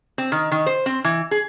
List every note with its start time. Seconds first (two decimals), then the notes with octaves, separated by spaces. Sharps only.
0.18 C4
0.32 D#3
0.52 D#3
0.66 C5
0.86 C4
1.04 E3
1.31 G#4